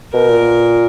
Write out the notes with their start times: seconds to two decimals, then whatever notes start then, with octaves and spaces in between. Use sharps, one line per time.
0.14 B2 A#4
0.29 A#2